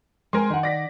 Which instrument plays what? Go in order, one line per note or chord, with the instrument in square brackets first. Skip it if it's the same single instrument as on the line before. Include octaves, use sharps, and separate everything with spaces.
[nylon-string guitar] G#3 C4 [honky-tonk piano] A#4 G#5 C6
[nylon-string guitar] D#3 F#5
[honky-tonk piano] D5 A#6 B6